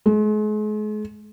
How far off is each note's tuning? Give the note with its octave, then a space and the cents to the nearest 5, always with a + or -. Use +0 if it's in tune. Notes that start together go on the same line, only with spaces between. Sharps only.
G#3 +40